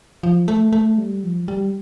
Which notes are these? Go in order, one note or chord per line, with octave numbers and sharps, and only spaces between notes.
F3
A3
A3
G3
F3
G3